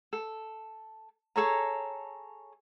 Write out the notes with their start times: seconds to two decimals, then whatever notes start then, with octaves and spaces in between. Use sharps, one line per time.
0.13 A4
1.36 G#4 A4 C#5 A#5